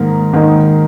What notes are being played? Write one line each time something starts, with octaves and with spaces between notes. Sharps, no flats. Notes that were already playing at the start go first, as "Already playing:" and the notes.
Already playing: G#2 D#3 A#3 D#4 A#4
G#2 D#3 A#3 D#4 A#4